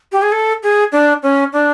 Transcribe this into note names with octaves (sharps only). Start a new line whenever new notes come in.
G4
G#4
A4
G#4
D4
C#4
D4